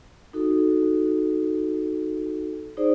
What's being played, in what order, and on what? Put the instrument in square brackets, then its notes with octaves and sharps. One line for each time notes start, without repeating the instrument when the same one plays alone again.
[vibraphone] D#4 F#4 A4
D#4 G#4 C5 D5